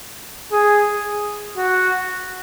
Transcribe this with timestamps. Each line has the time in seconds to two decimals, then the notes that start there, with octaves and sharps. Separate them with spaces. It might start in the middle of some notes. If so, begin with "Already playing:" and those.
0.52 G#4
1.57 F#4